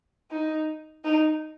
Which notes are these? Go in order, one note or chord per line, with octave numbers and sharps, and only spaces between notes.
D#4
D#4